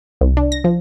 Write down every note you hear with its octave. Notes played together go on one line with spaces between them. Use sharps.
C2
D4
A#6
F3